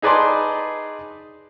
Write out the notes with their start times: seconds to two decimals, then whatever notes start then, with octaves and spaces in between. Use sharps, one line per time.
0.02 D#4 G#4 B4 D5 A5 C6